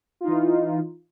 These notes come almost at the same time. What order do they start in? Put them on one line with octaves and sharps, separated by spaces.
F4 D#4 E3